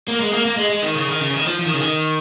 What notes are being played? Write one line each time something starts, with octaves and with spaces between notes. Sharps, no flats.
A#3
G#3
A#3
A#3
G#3
G#3
D#3
C#3
D#3
C#3
D#3
F3
F3
D#3
C#3
D#3